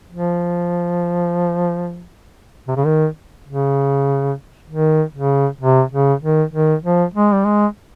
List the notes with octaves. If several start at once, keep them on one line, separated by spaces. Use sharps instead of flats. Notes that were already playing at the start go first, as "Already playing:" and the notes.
F3
C3
C#3
D#3
C#3
D#3
C#3
C3
C#3
D#3
D#3
F3
G#3
G3
G#3